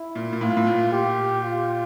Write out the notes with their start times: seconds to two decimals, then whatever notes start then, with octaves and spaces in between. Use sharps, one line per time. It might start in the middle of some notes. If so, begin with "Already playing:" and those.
Already playing: E4
0.15 A#2
0.32 A#2
0.41 A2 F4
0.57 A2
0.67 A#2
0.92 G4
1.44 F4